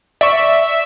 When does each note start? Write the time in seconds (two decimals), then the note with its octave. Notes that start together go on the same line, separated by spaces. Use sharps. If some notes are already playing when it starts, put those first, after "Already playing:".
0.21 D5 E5 C#6